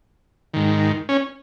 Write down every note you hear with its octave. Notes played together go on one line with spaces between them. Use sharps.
G#2 D#3
C#4